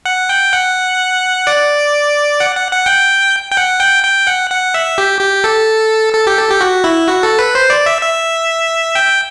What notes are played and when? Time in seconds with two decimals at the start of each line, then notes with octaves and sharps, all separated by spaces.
0.05 F#5
0.29 G5
0.53 F#5
1.47 D5
2.40 F#5
2.56 F#5
2.71 F#5
2.86 G5
3.51 G5
3.57 F#5
3.80 G5
4.04 G5
4.27 F#5
4.50 F#5
4.74 E5
4.98 G4
5.21 G4
5.44 A4
6.14 A4
6.27 G4
6.38 A4
6.50 G4
6.61 F#4
6.84 E4
7.08 F#4
7.23 A4
7.39 B4
7.55 C5
7.70 D5
7.86 E5
8.02 E5
8.95 G5